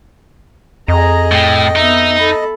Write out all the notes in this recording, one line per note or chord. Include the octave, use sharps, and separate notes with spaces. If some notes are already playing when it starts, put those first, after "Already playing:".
F2 G#4 D#5 A#5
A2 G5
B3 D#4 E5
A4 B5